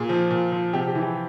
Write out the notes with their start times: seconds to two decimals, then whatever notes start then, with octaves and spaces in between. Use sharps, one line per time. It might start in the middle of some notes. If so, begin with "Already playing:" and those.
Already playing: A#2 G#4
0.09 F3
0.30 A#2
0.52 F3
0.73 C3 G4
0.87 G4
0.95 E3
1.02 G4